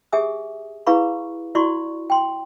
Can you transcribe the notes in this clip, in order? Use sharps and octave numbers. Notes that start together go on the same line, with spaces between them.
G4 G#4 E5 G#5 D#6
E4 G#4 B4 F5 B5 C#6
E4 F#4 D5 C6 C#6
G5 C6